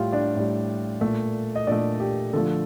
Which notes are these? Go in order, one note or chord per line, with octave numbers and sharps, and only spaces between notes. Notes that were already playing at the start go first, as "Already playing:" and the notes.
Already playing: A2 G3 F4 G4 F5 G5
D4 D5
A2 G3
A#2 A3
D#5
A#2 A3 D4 D5
G4
D3 F3 A3 A4